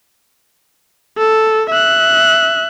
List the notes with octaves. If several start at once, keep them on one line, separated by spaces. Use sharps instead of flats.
A4
E5 F#6